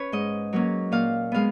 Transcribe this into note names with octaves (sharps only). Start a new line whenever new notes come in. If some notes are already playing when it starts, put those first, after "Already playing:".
Already playing: C#4 B4 C#5
G#2 D#5
F#3 A#3 C#4
A#2 F5
G#3 B3 F5